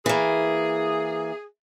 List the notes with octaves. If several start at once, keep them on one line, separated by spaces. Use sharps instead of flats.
E3 A#3 G#4